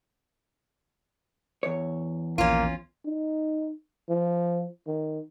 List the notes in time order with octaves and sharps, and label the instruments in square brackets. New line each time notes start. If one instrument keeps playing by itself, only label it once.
[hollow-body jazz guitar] E2 C#5
[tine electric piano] A#1 D#2 [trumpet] A#3 [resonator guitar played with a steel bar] C#4 F4
[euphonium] D#4
F3
D#3